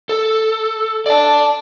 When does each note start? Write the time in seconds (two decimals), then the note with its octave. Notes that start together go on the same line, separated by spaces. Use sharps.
0.09 A4
1.06 D5 A5